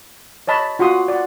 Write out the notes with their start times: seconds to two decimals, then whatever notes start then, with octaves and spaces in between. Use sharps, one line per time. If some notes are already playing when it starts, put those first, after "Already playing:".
0.47 C#5 D#5 A5 B5
0.79 F4 F#4 F#5 C6 D#6
1.08 D5 F#5